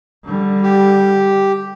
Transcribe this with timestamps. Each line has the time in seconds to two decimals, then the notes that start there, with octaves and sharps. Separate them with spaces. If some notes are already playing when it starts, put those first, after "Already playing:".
0.25 D3 G3
0.63 G4